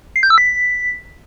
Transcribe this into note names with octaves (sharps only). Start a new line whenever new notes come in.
C7
G6
E6
B6